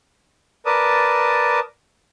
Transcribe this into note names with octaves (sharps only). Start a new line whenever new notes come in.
A#4 B4 D5 A5 D#6